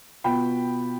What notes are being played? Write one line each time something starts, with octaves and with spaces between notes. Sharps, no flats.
B2 B3 F4 G5 B5